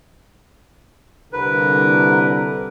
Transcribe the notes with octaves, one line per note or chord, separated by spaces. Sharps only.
C2 D3 A#4 B4